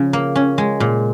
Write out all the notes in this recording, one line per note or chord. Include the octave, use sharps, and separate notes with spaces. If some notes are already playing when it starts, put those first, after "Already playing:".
Already playing: C#3 F3
A#3
C#4
G#3
A#2